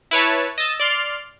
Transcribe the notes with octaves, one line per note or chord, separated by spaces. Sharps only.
E4 B4 C#5 A5
D#5 E6 A6
D5 C6 F6